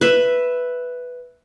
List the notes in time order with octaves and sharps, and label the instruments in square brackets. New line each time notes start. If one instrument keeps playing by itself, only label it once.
[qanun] B4 E5